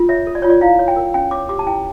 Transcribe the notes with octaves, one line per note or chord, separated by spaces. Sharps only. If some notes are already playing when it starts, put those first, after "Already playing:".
Already playing: F4
C#5 E5
A4
D5
F4 C#5
D5
E4 F5
C#5
G5
A#4
C#4 G5
C#5 D6
G4 D6
A5
E4 G5